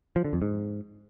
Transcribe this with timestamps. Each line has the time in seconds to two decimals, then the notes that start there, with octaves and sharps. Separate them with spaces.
0.16 F3
0.24 D3
0.33 F2
0.42 G#2